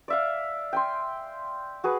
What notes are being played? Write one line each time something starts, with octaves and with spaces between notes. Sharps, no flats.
D5 E5 F5
G5 G#5 C6
F#4 G#4 B4